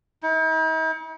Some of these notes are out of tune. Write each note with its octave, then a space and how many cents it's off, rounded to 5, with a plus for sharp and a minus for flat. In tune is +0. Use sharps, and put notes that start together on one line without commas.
D#4 +45